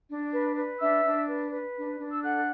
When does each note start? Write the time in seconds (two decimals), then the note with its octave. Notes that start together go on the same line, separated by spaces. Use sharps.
0.09 D4
0.33 B4
0.57 B4
0.80 D4 E5 E6
1.04 D4
1.28 B4
1.51 B4
1.76 D4
1.98 D4
2.12 E6
2.23 A4 F#5 F#6